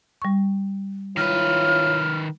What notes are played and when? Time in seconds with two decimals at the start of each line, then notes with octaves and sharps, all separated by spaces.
0.22 G3 C#6
1.17 D#3 E4 F4 B4 C#5 F6